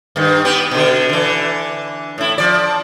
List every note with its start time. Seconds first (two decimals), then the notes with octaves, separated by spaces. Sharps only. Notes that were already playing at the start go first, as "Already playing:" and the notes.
0.16 G2 D#3
0.45 B3 G4
0.71 B2 D3
1.09 D3 E3
2.18 A2 E4
2.38 F3 D5